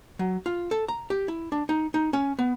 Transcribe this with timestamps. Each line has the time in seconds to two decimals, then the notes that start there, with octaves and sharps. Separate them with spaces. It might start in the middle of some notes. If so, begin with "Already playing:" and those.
0.19 F#3
0.46 F4
0.71 A4
0.88 A#5
1.10 G4
1.28 E4
1.52 D4
1.69 D#4
1.94 D#4
2.13 C#4
2.39 B3